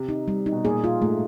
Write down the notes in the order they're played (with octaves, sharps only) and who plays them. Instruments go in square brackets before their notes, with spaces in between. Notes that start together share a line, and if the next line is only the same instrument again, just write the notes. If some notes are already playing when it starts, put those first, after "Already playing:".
Already playing: [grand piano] C3
[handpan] D#4
G3
D#4
[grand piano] B2
[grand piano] A#2 [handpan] G#4
[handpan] F4
[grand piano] G#2 [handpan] A3